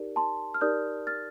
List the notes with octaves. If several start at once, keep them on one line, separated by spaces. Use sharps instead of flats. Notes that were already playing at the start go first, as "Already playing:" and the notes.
Already playing: D#4 G4 A#4 D5
A5 C6
F6
D#4 G4 A#4 D5 D#6 G6
F6 A6